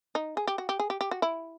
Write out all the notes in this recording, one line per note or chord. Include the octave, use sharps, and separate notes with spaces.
D#4
G#4
G4
F#4
G4
G#4
G4
G4
F#4
E4